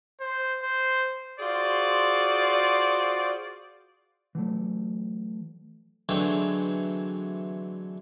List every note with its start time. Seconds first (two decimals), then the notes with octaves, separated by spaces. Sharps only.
0.21 C5
0.63 C5
1.40 F4 F#4 G#4 C5 D5
4.35 E3 F#3 A3
6.09 D3 E3 F#3 G#3 A3 C4